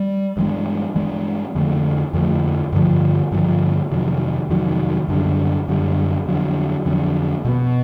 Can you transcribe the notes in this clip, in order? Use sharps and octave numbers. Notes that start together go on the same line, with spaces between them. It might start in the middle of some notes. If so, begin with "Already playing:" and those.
Already playing: G3
G2 E3 G#3
G2 E3 G#3
F2 D3 F3 A3
F2 D3 F3 A3
G2 D3 F3
G2 D3 F3
F2 C3 D#3 F#3
F2 C3 D#3 F#3
F#2 D3 G3
F#2 D3 G3
F2 D3 F#3
F2 D3 F#3
B2 G3 B3